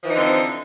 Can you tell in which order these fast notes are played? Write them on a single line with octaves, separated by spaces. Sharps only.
F3 E3 D#4 D3 C4